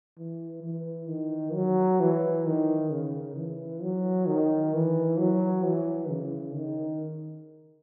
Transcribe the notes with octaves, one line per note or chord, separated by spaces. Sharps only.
E3
E3
D#3
F#3
E3
D#3
C#3
E3
F#3
D#3
E3
F#3
E3
C#3
D#3